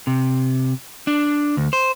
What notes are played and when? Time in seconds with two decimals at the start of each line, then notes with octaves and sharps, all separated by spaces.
0.07 C3
1.07 D4
1.57 D2
1.73 C5